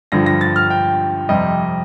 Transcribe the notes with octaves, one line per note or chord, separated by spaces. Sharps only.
G2 D3 F3 A#6
A#6
A6
F6
G5
F2 C3 G3 D#5